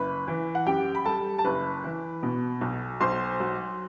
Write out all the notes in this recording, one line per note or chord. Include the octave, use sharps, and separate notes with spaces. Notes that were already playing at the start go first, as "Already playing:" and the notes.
Already playing: F#1 B4 B5
E3
F#5
F#2 G4 G5
B5
G3 A4 A5
A5
F#1 B4 B5
E3
B2
B1
B1 C5 C6
F#3